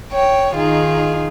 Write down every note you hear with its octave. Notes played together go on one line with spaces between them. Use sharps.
C#5 G5
D#3 D#4 F4 G#4